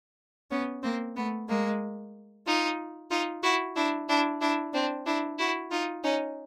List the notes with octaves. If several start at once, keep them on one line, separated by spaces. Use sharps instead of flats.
B3 C#4
A#3 C4
A3 B3
G#3 A#3
D#4 F4
D#4 F4
E4 F#4
D4 E4
D4 E4
D4 E4
C4 D4
D4 E4
E4 F#4
D#4 F4
C#4 D#4